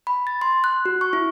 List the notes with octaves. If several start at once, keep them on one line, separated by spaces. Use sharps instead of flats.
B5
A6
C6
F#6
F#4
C#6
E4